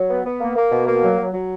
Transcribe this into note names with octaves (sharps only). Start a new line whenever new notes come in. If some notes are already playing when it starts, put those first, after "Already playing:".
Already playing: F#3
B3
B3
A#3
A#3
B2
A#3
F#3
F#3
F#3